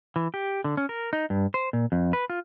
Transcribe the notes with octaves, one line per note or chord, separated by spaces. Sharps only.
E3
G4
D3
C#4
A#4
D#4
G2
C5
A#2
F2
B4
F4